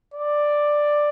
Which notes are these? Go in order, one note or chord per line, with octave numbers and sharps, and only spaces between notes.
D5